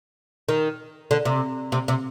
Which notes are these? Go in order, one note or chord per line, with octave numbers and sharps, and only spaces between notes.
D#3
D3
C3
C3
C3